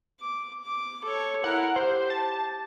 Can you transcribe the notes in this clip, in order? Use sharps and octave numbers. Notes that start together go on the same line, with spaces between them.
D6
D6
A4 C#5
E4 A#4 F#5
G4 C5
A5